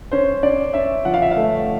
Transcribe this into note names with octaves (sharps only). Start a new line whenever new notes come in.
C#4 C5
C#4 D5
C#4 E5
F3 F#5
F5
E5
F5
A3